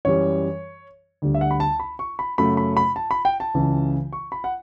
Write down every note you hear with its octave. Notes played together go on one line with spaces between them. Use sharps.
F#2 E3 G3 C#5
D2 D3 G3
E5
F#5
B5
A5
B5
C#6
B5
F#2 C#3 F#3 A3 B5
B5
B5
A5
B5
G5
A5
C#2 C#3 E3
C#6
B5
F#5